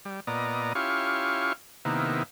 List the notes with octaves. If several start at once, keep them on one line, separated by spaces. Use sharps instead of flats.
G3
A#2 B3 D5 D#5 A#5
C#4 E4 F4 G4 F5 C#6
C3 D#3 A#3 B3 E4